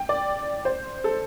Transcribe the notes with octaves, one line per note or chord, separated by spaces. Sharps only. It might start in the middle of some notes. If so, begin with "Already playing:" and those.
Already playing: G5
D5
C5
A4